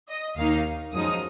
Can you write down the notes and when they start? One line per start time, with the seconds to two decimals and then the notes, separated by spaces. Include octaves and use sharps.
0.09 D#5
0.37 D#2 D#3 A#3 D#4 F5
0.93 F#2 F3 G#3 D#4 D#6